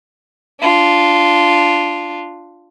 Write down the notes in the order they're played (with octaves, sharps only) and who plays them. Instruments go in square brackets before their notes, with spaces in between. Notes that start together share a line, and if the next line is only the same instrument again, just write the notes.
[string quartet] D4 F4